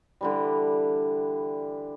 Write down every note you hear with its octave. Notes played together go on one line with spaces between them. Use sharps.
D3 E3 G3